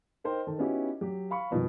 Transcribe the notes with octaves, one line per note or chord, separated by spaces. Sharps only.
D#4 A#4 C5 G5
D#3 A4
B3 C#4 D#4 E4 F#4 G4
F#3 G4
F5 B5 C#6
F2 B2 D#3 F3 G3